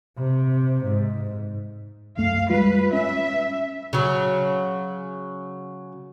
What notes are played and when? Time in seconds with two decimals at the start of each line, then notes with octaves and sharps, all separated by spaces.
0.18 C3
0.86 G#2
2.17 C2 F#2 A3 F5
2.50 G3 G#3 F4 B4
2.93 C#4 E5
3.93 C#3 F#3